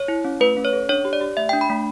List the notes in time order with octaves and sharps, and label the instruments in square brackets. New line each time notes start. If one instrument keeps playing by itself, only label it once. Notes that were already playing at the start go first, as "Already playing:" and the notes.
Already playing: [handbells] C#5
E4
C#4
A3 B4
C#4
C#5
A4
D4 C#5
G4
D5
G4
A3 E5
D4 G5
B5
A3